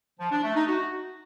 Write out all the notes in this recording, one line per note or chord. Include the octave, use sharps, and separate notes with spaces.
F3
D4
A3
D#4
F#4